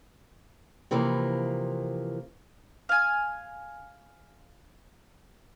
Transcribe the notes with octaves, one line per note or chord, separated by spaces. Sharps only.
C3 E3 F3 A#3
F5 G#5